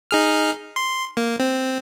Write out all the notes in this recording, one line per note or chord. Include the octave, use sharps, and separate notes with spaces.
D#4 G#4 F6
C6
A#3
C4